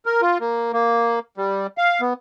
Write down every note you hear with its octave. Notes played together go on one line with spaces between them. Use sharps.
A#4
F4
A#3
A#3
G3
F5
B3